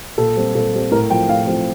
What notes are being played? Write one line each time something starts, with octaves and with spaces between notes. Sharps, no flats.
A#2 A4
G3 C4
A#2 A4
G3 C4
A2 A#4
F3 C4 G5
A2 F5
F3 C4